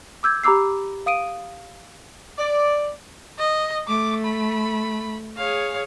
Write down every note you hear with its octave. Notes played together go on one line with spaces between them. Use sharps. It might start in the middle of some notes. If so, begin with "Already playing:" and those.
D6 E6 G6 G#6
G4 A#5 B5 D6 E6 C7
F5 D#6 D7 D#7
D5
D#5
A3 D6
B5
G#4 C#5 F5